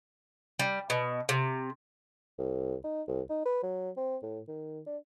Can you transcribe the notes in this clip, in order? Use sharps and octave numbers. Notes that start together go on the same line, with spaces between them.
G3
B2
C3
C2
D#4
C2
D#4
B4
F#3
C4
A2
D#3
D4